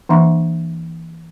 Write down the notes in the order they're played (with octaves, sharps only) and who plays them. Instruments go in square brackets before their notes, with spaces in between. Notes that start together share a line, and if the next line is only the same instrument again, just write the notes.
[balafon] E3 A#3 D4 E5 C#6